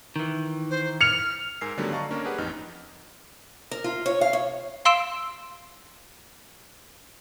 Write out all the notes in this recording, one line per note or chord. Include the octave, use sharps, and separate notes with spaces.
D#3 E3
C5
F6 C#7 F7
G#2 A#4 G#5 E6 C7
D3 D#3 F#3 G3 A3 B3
D5 D#5 F5 A5 A#5 C#6
A#3 C#4 D4 A#4
G4 G#4 B4 F#5
A1 F2 D#4 F6
A#4
F4
C#5
F5
C#5
F5 C6 E6 D7 E7